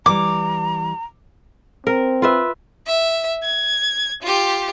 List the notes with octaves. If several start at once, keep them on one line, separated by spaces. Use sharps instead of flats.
E3 G3 A#5 D6
C4 A#4
F4 B4 E5
E5
G#6
F4 G4